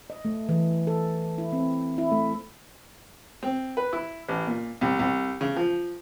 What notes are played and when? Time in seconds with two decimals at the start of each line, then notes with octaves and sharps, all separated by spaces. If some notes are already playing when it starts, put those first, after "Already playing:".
0.10 D#5
0.25 A3
0.49 E3
0.87 A4
1.38 E4
1.52 C4
1.98 E4
2.11 A3
3.43 C4
3.77 B4
3.93 E4
4.29 A1
4.47 A#2
4.81 C2
4.99 C2
5.41 C#3
5.56 F3